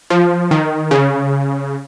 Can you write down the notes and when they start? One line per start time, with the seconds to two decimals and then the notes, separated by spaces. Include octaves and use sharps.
0.10 F3
0.51 D#3
0.91 C#3